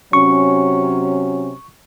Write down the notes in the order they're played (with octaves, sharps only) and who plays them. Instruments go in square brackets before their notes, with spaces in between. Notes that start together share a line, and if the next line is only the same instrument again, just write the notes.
[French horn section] C3 F#3 C#4 [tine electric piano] C#6